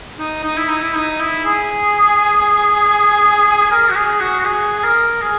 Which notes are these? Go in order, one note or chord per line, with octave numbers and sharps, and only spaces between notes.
D#4
D#4
E4
D#4
E4
D#4
E4
G#4
A#4
F#4
G#4
F#4
F#4
G#4
G#4
A#4
G#4